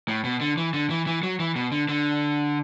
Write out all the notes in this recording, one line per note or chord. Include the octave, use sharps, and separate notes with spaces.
A2
B2
D3
E3
D3
E3
E3
F#3
E3
B2
D3
D3